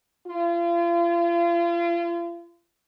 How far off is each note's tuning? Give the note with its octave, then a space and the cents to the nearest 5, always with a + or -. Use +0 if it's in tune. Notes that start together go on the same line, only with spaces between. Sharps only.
F4 -35